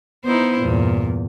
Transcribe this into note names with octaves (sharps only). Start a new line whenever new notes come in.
B3 D#4 E4 C5
E2 G2 A#2